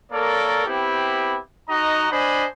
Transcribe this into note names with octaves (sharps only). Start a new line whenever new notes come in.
A#3 A4 A#4 C#5 D5
B3 C4 E4 G4
D#4 F#4 D#5 A#5
D4 C5 D#5 G#5 B5